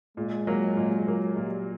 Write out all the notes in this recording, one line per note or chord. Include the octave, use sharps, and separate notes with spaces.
A#2 G#3
F#3 A#3
A#2
F#3 A#3
A#2 G3